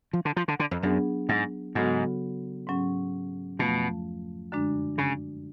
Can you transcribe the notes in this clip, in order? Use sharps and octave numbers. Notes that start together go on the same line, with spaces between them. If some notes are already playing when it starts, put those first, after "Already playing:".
F3
D3
F3
D3
D3
F2
F#2 F#3 B3 D4 G#4
G#2
G#2 C#3 F#3 B3 F#4 A4
G#2 F#3 C#4
F2 B2 F3 A3
F#2 D3 G#3 D4
C#3